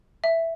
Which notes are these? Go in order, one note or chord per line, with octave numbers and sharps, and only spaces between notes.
E5